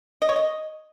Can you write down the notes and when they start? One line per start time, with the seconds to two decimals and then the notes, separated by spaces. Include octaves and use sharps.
0.22 D#5
0.29 C#5
0.36 D#5